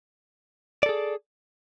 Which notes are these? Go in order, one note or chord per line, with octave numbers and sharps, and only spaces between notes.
G#4 A4 D5